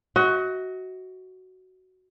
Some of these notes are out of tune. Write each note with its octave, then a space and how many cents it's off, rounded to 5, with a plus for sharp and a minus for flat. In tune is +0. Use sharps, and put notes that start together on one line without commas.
F#4 +10 D#5 +45